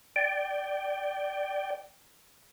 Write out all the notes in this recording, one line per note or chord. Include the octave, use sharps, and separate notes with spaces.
D5 G5